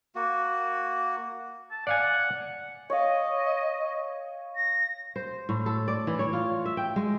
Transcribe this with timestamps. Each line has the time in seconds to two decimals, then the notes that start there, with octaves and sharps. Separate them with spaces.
0.15 A#3 F#4
1.71 A5
1.87 D5 F5 F#5 G#5
2.90 C#5 D#5 F5
4.56 A#6
5.16 C5
5.49 A2
5.66 A4
5.88 D5
6.07 E3
6.19 C#5
6.33 F4
6.65 E5
6.77 G5
6.96 G#3